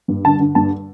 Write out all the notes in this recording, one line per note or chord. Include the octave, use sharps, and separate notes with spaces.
G2
D3 A5
D3
G2 A5